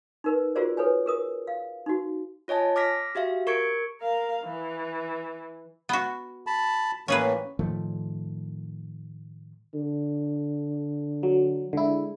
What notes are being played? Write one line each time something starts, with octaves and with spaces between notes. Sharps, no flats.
D#4 A#4 B4
F4 F#4 G#4 A#4 C5 D5
A4 B4 C#5 G#5
G#4 A#4 D#6
F5
D#4 F#4
F4 C#5 D#5 G#5 A5
D6 F6 A#6 B6
F#4 G4 E5 F5
A#4 C#6 G#6 C#7 D7
A#4 F5
E3
B3 F#4
A5 B5
A2 E3 A#3 C#4 G#4 B4
A2 D#3 F3 A3
D3
F#3
D3 G#3 E4